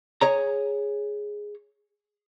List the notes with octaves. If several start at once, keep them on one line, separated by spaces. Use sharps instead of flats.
G#4 C#5 A#5